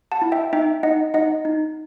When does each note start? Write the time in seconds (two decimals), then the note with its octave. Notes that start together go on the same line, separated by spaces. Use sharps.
0.12 F#5 A5
0.22 E4
0.32 E5 G5
0.53 D#4 E5 G5
0.83 D#4 D#5 F#5
1.14 D#4 D#5 F#5
1.45 D#4